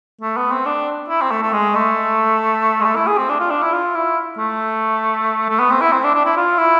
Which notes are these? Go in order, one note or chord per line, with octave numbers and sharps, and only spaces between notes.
A3
B3
C4
D4
E4
C4
A3
A3
G#3
A3
G#3
A3
E4
G#4
C4
D4
F4
D4
E4
F4
E4
A3
A3
B3
C4
E4
C4
D4
D4
E4
F4
E4